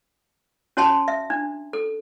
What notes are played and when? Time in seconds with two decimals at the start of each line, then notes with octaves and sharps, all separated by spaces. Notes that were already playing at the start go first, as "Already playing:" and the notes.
0.77 C#4 F#4 C#5 G#5 A5 C6
1.08 E5
1.30 D4
1.73 A4